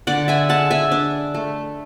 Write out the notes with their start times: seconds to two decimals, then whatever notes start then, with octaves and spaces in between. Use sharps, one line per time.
0.07 D3 D5 F#5
0.28 E5 G#5
0.49 G#3 F#5 A5
0.71 E5 G#5
0.92 D4
1.34 A3